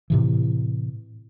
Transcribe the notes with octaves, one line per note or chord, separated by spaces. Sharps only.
A2 C3 E3